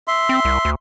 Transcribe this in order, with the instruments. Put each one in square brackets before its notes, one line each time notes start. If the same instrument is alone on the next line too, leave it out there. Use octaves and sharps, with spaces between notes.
[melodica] E5 C6
[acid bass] C4
C2
D2